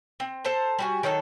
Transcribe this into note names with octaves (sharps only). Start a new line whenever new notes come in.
C4
A4 C5 A5 A#5
G3 F#4 G#5
D#3 F#3 D#4 A4